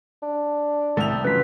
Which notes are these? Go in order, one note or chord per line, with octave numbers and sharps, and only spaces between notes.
D4
C2 A2 A4 E5 G5 F7
F#2 C#3 E3 F4 B4 B6